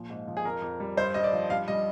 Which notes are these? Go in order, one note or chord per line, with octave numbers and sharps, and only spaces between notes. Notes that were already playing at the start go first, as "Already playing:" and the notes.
Already playing: A#2 F3
G#2
F3
G#4
F2 A#4
F2
G3
G2 C5
G2 D#5
D5
F3
G2 F5
G3 D#5